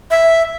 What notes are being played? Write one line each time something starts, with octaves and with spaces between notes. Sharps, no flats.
E5